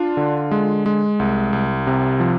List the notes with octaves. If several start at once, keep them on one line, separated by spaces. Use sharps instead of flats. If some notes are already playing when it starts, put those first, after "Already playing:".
Already playing: D4 F4
D3
G#3
G#3
C2
C2
C3
F3